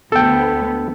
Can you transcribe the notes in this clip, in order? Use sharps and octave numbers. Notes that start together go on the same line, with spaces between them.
D2 B3 A4 G5